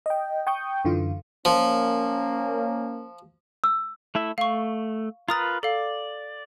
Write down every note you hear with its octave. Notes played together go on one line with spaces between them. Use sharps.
D#5 G5
G5 C#6 D#6 G6
F#2 D3 E3 F4
F3 A#3 C#4
E6
A3 E4 E5
A3 F5 C#6
F4 A#4 B4 A#5 D#6 A6
A4 D5 F5